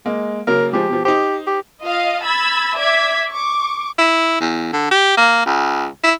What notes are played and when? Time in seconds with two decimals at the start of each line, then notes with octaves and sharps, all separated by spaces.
0.06 G#3 A#3
0.47 C#3 F#3 A#3 A#4
0.73 F3 G#3 G4
0.89 B2 F3
1.05 D#4 G4 C5
1.47 G4
1.81 F4 D#5 F5
2.22 B5 E6 G#6 A6
2.76 D5 E5 D6 G#6 B6
3.31 C#6 D6
3.98 E4
4.40 E2
4.73 D3
4.91 G4
5.17 A#3
5.46 C#2
6.03 E4